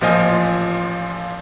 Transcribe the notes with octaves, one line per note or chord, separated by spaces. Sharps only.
A1 A#2 F3 F4 D#5 G#5